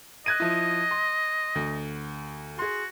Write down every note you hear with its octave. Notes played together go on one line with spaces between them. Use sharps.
D#5 F#6 G#6 D#7
F3 E4
C6
D2
F#4 G#4 C6